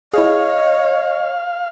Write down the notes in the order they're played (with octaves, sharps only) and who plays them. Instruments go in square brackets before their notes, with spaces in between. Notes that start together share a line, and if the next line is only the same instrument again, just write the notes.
[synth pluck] E4 G#4 [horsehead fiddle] C#5 [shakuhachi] D#5 [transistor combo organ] F5